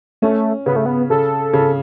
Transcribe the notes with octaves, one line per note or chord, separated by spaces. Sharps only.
A3 C#4
C#3 B3
A3
B3
C#3 A4
C#3